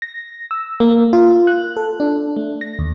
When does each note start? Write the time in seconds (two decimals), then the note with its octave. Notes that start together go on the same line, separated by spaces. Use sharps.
0.02 A#6
0.51 E6
0.80 A#3
1.13 F4
1.47 F#6
1.77 A4
2.00 D4
2.36 A3
2.61 A#6
2.79 D#2